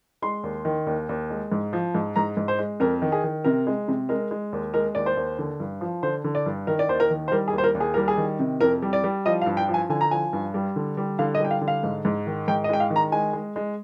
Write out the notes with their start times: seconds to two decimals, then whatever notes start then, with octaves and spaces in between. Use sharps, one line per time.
0.22 G#3 C6
0.44 D#2
0.65 D#3
0.87 D#2
1.09 D#2
1.30 G#3
1.52 G#2
1.73 F3
1.95 G#2
2.16 G#2 A#5
2.37 G#2
2.48 C5
2.59 G#3
2.80 F2 A#4
3.02 D#3
3.12 G#4
3.24 D#3
3.44 C3 A#4
3.67 G#3
3.88 C3
4.09 G#3 A#4
4.31 G#3
4.53 D#2
4.74 G#3 A#4
4.95 D#2 D5
5.06 C5
5.17 D#2
5.39 D3
5.60 G2
5.81 F3
6.03 D3 C5
6.24 D3
6.35 D5
6.46 G2
6.67 D#3 A#4
6.79 D5
6.89 D#2 C5
7.00 A#4
7.10 D#3
7.28 C5
7.32 G3 A#4
7.48 G#4
7.53 D#2
7.58 C5
7.64 A#4
7.75 D#2
7.80 G#4
7.94 G3 A#4
8.08 G#4
8.18 D#3
8.39 C3
8.61 F2 A#4
8.82 G3
8.93 D5
9.04 G3
9.26 F3 D#5
9.42 F5
9.46 G2
9.57 G5
9.68 F3
9.74 G#5
9.90 D3 G#5
10.01 A#5
10.11 F3 G#5
10.33 G2
10.54 G3
10.76 D3
10.97 G3
11.19 D3 F5
11.35 D#5
11.40 G3 G5
11.51 F5
11.61 D3
11.68 F5
11.83 G#2
12.05 G#2
12.26 D#3
12.48 G#2 G5
12.64 D#5
12.69 G#3 G5
12.80 F5
12.90 D#3
12.96 A#5
13.12 G#3 G#5
13.33 G#3
13.56 G#3